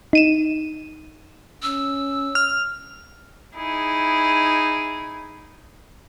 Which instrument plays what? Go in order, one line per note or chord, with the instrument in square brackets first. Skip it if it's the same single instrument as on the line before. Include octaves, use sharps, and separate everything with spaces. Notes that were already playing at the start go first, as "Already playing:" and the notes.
[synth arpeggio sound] D#4 D#7 E7
[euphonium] C#4 [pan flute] E6
[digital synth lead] F6
[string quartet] D#4 E4 G#4